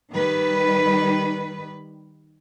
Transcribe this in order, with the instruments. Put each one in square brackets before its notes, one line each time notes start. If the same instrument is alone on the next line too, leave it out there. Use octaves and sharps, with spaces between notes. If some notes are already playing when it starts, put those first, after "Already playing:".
[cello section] D#3 G3 B4